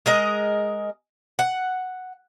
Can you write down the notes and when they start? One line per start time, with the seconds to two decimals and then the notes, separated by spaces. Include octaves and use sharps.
0.06 G#3 A#4 D#5
1.39 F#5